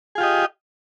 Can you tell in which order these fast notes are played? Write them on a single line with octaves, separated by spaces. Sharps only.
G#4 F4 G4 D#5